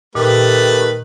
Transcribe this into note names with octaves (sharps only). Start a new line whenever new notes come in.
A#2 D#3 A3 G4 B4